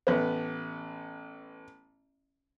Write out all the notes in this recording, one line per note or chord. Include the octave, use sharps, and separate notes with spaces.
A1 B3